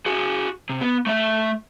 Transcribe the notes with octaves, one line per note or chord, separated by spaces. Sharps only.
F#4 G#4
C3
B3
A3 E5